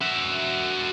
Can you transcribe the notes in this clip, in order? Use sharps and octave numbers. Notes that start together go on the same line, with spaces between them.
F#4 E5